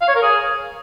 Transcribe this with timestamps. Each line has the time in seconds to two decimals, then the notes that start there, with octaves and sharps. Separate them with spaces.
0.01 F5
0.08 C#5
0.15 A#4
0.22 G#4